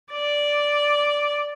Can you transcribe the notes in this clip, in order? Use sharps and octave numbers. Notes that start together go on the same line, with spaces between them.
D5